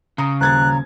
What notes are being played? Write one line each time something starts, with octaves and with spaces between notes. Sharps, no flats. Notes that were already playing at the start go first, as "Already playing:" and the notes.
C#3 A#5 D#6
D#1 A#5 F#6 G#6 A6